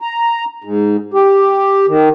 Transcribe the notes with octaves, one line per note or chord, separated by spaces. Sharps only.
A#5
G#2
G4
D#3